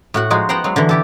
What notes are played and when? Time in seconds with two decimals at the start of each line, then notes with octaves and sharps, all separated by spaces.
0.14 A2 F#4 F#5
0.30 F3 G#3 D#4 F#4
0.49 B3 C5 F#5 G5 A#5 C6
0.64 F#3 G#3 F5
0.76 D3 E3
0.89 E4 G4 A4